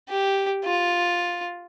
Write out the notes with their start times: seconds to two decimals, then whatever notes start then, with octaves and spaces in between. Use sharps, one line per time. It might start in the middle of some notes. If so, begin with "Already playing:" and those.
0.09 G4
0.65 F4